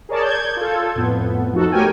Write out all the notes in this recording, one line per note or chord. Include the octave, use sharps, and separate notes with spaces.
G#4 A#4 C#5 D5 A5
G6 G#6
F4 A4
F2 A2 B3
F3 D#4 F#4 A4
A3 G4 A#4 C#5 G5 G#5